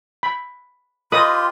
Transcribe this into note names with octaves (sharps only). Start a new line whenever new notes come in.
B5
F4 G4 B4 D#5 C6 D#6